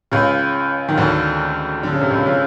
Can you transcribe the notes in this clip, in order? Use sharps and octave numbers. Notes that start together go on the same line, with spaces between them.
C#2 C#3
D#3
D2 D3
D3
C#3
C3
C#2 C#3
C#3